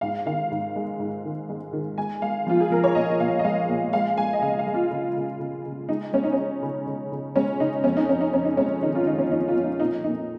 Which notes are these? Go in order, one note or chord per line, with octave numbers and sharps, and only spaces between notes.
G#2 F5
D#3 F5
G#2
G#3
G#2
D#3
G#3
D#3
G#3 G#5
G#3 F5
F3 F4
G#4
F3 A#4
C#5
A#2 D#5
A#2 F5
D#5
G#3 F5
A#2
G#3 F5
G#3 G#5
D#5
C#3 F5
F5
G#3
F4
C#3
C#3
C#3
C#3
G#3 D#4
G#3 C#4
D#4
C#4
G#3
C#3
C#3
C#3
G#3 C#4
C#3 D#4
F2 C#4
D#4
F2 C#4
D#4
F2 C#4
D#4
G#3 C#4
D#3 D#4
F4
D#3 D#4
C#4
F2 D#4
F4
F2
D#4
A#2 D#4
A#2 D#4